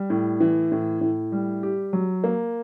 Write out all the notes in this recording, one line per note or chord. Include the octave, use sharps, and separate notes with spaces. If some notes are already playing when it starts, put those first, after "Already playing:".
Already playing: G3
A2
E3
A2
A2
G3
G4
F#3
A#3